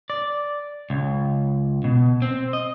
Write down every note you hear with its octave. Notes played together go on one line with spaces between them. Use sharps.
D5
C#2
B2
C4
D#5